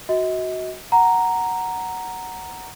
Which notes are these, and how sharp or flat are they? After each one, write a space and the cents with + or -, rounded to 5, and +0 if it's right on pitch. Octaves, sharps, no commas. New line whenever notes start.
F#4 +0 D#5 +40
F#5 +0 A#5 +0